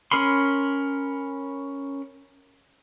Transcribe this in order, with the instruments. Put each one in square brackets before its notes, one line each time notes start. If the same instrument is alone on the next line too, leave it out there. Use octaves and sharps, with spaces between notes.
[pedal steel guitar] C#4 A#4 B5 C6